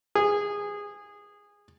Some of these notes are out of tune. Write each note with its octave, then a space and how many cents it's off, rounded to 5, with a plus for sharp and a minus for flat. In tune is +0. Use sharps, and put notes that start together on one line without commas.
G#4 -15